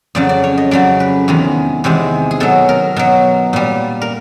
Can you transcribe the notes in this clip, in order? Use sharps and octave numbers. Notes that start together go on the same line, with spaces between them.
F2 C#3 F#3 D5
D5
C#5
D#5
F2 C#3 F#3 D5
B4
E2 C3 D#3 G#3
E2 C3 D#3 G#3
G#4
B2 F#3 A4
A#4
B2 F#3
A#2 G3
A#4